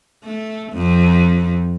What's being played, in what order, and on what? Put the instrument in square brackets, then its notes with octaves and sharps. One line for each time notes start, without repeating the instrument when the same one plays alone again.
[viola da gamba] A3
F2